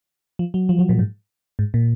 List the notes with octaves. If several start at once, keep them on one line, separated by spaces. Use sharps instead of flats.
F3
F#3
F3
F#3
A#2
G#2
G#2
A#2